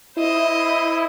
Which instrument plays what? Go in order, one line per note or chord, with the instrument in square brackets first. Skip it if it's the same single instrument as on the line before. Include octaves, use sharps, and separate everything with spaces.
[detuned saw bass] E4 [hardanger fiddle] C5 D#5